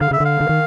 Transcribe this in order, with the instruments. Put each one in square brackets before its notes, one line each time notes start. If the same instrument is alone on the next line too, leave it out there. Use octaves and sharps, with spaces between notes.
[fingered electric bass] D3 [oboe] F5
[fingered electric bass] C#3 [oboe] E5
[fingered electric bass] D3
[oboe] F5
[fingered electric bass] D3
D#3